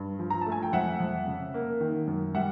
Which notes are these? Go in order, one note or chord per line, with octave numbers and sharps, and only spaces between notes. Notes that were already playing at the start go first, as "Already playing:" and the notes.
Already playing: G2
F3
A#5
A5
A3
G#5
G5
F2 E5 F#5
F2
C#3
A#3
D#3
F#2
G3 E5 F#5